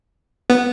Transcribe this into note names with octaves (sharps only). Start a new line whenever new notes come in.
B3